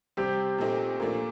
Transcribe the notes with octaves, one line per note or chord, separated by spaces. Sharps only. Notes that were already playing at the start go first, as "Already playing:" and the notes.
C3 G3 C4 G4
A#2 A3 C4 D#4
A#2 F3 A3 A#3 D4